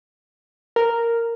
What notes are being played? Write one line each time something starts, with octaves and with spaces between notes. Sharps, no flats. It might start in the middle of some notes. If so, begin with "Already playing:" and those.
A#4